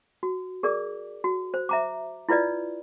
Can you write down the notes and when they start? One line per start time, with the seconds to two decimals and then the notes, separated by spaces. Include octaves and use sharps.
0.23 F#4
0.63 G#4 A#4 D5 D6
1.24 F#4
1.54 C5
1.69 E5 A#5 D6
2.29 E4 F4 B4 D5 D#5